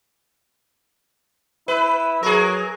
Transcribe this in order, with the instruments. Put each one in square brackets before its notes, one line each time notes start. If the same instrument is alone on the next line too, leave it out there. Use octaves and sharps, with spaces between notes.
[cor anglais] E4 [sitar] B4
[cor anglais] F#3 [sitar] G#4 A#4